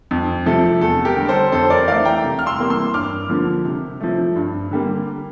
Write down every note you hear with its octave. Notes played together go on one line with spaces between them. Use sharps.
F2
C3 F3 A3 A4
E2 A4
G4 A#4
D3 G3
A4 C5
F2 A4 C5
A#4 D5
E3 A3 D5 F5
G5 A#5
C3
F6
C6 E6
E3 G3 A#3
C6 E6
G2 D6 F6
D3 F3 A#3
C3
F3 A3
G2
D3 G3 A#3